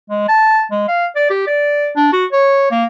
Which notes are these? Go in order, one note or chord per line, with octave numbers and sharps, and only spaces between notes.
G#3
A5
G#3
F5
D5
G4
D5
D4
F#4
C#5
A#3